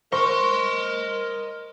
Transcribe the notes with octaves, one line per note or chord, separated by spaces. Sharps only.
A#4 C5 D#5 C6 C#6